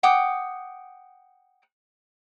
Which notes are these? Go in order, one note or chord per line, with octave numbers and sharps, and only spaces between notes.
F#5 G5 D6 D#6